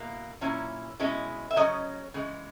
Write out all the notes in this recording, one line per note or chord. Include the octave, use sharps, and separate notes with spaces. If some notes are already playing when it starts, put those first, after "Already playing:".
Already playing: B2 A#3 E4
A#2 F#3 C#4 E4
B2 G#3 C#4 E4
E5
C#3 F#3 C#4 D#5
C#3 E3 G#3